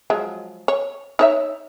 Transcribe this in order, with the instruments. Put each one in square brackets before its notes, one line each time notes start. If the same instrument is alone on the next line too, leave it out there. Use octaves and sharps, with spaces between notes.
[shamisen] F3 F#3 G#3
C#5
D#4 C#5 E5